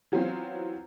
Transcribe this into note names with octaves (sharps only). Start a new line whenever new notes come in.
E3 F#3 B3 C4 F4